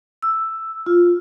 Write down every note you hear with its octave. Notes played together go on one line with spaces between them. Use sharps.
E6
F4